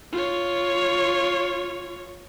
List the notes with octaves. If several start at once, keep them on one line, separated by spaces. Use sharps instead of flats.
F4 C#5